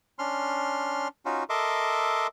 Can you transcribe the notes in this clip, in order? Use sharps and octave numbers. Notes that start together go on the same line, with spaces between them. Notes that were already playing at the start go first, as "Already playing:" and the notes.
C#4 D4 C6 F6
C#4 D#4 F4 F#4
A4 A#4 D#5 E5 C6 D6